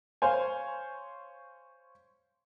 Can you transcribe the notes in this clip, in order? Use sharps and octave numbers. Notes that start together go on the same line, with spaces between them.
C5 C#5 F5 G#5